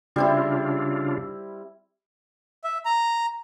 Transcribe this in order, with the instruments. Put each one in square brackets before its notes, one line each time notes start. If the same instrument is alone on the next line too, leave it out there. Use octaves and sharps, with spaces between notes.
[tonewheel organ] C#3 D4 F4 [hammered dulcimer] G3 C4 E4
[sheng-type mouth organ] E5
A#5